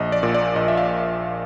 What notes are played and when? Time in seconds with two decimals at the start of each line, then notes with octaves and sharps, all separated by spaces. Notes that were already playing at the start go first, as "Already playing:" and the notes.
Already playing: A#1 D#5
0.12 D5
0.23 A#2
0.34 D5
0.56 A#1 D#5
0.68 E5
0.77 F5